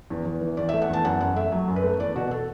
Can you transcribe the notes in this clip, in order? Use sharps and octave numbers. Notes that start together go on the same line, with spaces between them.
E2
E2
E3
E2 D5
E5
A3
F#5
E2 A5
F#2 F#5
F#2 F#5
A3 E5
F#3
F#2
B4
A3
E2 D5
B2 F#4
A4